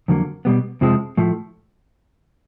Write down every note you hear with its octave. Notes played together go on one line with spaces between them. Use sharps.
F2 D3 F#3 A#3
B2 G3 B3
F2 C3 F3 G#3 C4
A2 F3 A3